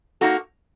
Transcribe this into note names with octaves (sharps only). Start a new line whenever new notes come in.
A#3 D#4 F#4 A4